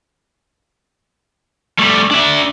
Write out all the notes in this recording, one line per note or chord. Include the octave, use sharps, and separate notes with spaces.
G3 A3
D4 E5